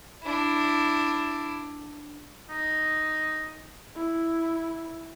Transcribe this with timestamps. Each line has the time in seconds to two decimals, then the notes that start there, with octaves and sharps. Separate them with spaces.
0.23 D4 E4
2.49 D#4
3.96 E4